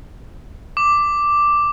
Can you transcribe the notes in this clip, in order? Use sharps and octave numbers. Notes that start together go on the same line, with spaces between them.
D6